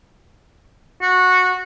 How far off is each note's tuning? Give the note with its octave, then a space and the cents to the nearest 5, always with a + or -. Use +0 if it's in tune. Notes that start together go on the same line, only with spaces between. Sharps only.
F#4 -15